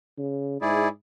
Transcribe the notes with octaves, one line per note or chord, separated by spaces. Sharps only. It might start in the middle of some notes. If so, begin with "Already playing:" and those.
C#3
G#2 E4 G#4 D5